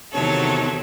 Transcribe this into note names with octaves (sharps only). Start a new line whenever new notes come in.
E2 C3 D#3 F#3 A4 C#5